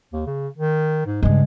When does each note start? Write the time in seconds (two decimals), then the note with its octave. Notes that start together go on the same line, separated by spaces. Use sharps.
0.13 D#2
0.26 C#3
0.58 D#3
1.06 G#2
1.22 G2 C#3 G#3